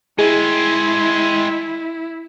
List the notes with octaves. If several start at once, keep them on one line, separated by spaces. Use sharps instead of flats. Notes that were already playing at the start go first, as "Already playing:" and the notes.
G#3 C4 E4 G#4